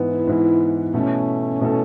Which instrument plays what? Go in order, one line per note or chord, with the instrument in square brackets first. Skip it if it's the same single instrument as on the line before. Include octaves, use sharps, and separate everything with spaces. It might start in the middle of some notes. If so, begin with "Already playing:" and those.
Already playing: [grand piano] G#2 E3 B3
[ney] E4
[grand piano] G#2 E3 B3
[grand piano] B2 A3 E4 A4 [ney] C#4
[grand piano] B2 A3 E4 A4